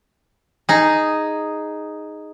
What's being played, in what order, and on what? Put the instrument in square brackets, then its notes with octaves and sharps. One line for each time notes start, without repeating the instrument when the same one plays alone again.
[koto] D#4 G#4